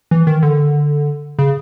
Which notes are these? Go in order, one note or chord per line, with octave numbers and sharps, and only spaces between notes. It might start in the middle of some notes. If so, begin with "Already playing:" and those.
E3
D#3
D3
C#3